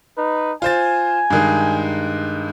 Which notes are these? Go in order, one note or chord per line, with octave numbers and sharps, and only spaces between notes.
D#4 B4
F4 C5 G#5 A6
G2 D#3 G#3